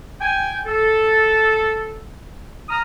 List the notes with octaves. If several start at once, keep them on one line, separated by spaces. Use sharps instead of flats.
G5 G#5
A4
A#5 D#6 F6